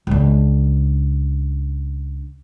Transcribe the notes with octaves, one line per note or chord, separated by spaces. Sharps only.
C#2 D4